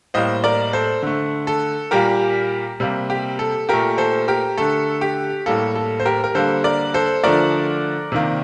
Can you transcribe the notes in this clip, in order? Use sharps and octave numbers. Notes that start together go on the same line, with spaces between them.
A2 G3 A#3 C5 D#5
A#4 D5
A4 C5
D3 A3
A4
A#2 G3 A#3 G4 A#4
C3 G3 A#3
G4
A4
A#2 A3 G4 A#4
A4 C5
G4 A#4
D3 A3 A4
G4
A2 G3 A#3 A4
A4
C5
G4 A#4
A#4
D3 G3 A#3 A4 C5
A#4 D5
A4 C5
D3 F3 A3 A#4 D5
C3 D#3 A#3